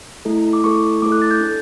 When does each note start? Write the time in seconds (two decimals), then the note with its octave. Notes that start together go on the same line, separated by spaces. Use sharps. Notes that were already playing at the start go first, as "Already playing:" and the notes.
0.25 A3 E4 A4
0.53 D6
0.64 A3 E4 A4 C#6
1.02 A3 E4 A4 D6
1.12 F#6
1.22 A6
1.31 G6
1.40 D4 A4